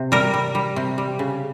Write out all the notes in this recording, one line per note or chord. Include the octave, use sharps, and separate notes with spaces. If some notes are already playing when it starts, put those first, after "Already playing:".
Already playing: C3
G3 A#4
G3
G3
C3
G3
C#3